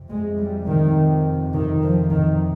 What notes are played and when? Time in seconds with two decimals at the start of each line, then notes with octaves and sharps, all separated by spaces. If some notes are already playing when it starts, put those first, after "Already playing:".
Already playing: F2 C3
0.09 G#3
0.38 G3
0.67 D#3
1.54 D#3
1.82 F3
2.10 D#3